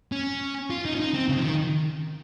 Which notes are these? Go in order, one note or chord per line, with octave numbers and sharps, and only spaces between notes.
C#4
F4
D#4
C#4
D#4
C4
C#3
F3
D#3